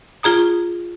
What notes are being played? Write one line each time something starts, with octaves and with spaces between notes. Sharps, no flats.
F4 G#4 A#5 D#6